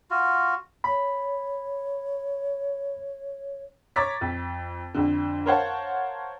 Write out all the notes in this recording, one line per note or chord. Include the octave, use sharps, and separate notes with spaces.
F4 F#4
C#5 B5
C#5 A#5 C#6 D6 A6 B6
F2
F2 D3
A#4 C5 C#5 F5 F#5 A5